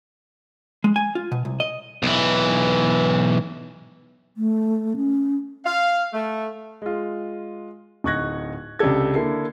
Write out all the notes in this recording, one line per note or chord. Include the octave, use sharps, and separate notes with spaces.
G#3
G#5
F4
B2
C2
D#5
B1 E3
A3
C#4
F5
A3
G#3 F4
D1 D#4 C#6 F#6 G#6 A#6
C#2 C3 D4 G4 A4 G#6
D3 A#3 E4 A4 C7